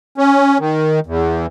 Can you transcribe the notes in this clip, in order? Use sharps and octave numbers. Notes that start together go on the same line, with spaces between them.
C#4
D#3
E2